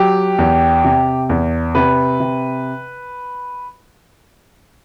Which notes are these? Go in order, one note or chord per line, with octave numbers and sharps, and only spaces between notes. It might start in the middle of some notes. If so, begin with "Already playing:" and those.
Already playing: F#3 G4
E2
C3
E2
C3 B4
C3